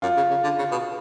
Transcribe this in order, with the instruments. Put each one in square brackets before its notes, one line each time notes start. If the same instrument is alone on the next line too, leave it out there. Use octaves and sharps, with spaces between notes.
[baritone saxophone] F#2 [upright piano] F4
[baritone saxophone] C#3
C#3
D3
C#3
B2